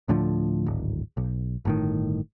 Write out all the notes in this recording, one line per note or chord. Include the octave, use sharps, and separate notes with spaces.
D2 A2 D3 F3
D1 G#1
B1
G1 A2 D#3